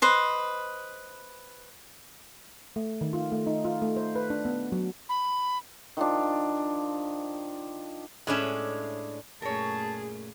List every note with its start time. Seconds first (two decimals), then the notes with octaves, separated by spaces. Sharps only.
0.02 B4 C5 D#5
2.76 A3
3.01 D#3
3.13 F4
3.32 A3
3.47 D#4
3.65 F4
3.82 A3
3.96 C5
4.16 B4
4.30 D4
4.45 B3
4.72 F#3
5.09 B5
5.97 D#3 F3 D4
8.27 A2 G#3 C#4 D4 E5
9.42 F#2 A#2 A3 G#4 A#4 C#5 A5